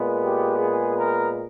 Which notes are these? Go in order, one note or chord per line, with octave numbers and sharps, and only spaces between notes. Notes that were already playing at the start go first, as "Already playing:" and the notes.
Already playing: A#2 G#3 B3
G4
G#4
A#4